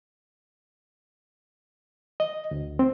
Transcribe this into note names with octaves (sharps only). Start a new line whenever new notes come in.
D#5
D2
C4